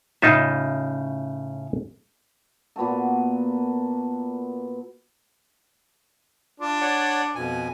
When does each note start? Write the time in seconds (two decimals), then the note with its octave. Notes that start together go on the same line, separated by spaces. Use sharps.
0.22 A2 C#3 D#4 F4 E5
2.76 A#2 B3 F#4 A4
6.60 D4 F4
6.81 C#5 D5 F#5
7.35 F2 B2 G#5